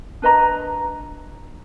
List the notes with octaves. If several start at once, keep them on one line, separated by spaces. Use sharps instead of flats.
D4 B4 D#5 A#5